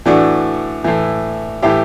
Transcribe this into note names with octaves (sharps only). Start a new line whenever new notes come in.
A2 E3 D4 F#4
A2 E3
A2 E3 E4 G4